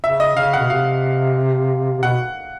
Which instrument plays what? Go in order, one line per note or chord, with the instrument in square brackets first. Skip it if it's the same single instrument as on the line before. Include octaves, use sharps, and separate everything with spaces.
[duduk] C#3 [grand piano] E5
[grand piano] D#5
[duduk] C#3 [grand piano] F5
[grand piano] F#5
[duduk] B2
[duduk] C3 [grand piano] F5
[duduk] C3
[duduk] B2 [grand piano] F#5